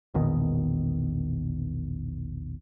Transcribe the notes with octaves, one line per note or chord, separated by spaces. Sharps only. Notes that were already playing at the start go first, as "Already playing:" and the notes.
E1 A#1 B2 D#3